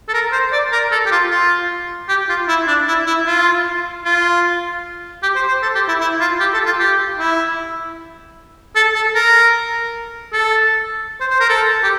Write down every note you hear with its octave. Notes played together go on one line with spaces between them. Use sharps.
A4
A#4
C5
D5
A#4
A4
G4
F4
F4
G4
F4
E4
D4
E4
E4
F4
F4
G4
C5
C5
A4
G4
E4
E4
F4
G4
A4
F4
G4
E4
A4
A4
A#4
A4
C5
C5
A#4
A4
G4